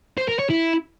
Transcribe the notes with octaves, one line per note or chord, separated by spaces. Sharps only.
C5
A#4
C#5
E4